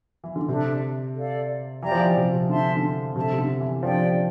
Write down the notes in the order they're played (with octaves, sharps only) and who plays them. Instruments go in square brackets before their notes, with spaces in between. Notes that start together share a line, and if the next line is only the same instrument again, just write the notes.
[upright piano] E3
D3
[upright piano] C3 [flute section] D4 A4 E5
[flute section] A4 D5 F5
[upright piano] E3 [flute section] G4 D5 G5 A#5
[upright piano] F3
E3
C3
C3
[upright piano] D3 [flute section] C5 E5 A5 C6
[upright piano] E3
D3
[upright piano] C3 [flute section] A4 E5 A5
[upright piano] C3
D3
E3
[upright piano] F3 [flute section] D4 G4 D5 G5